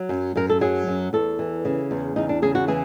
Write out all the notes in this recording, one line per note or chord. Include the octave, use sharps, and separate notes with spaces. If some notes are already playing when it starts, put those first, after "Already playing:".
Already playing: F#3
F#2
F#2 A#4
A4
F#3 G#4
F#2
E2 A4
E3
C#3
E2
E2 D#4
D4
C#3 G#4
F#4
E3 G#4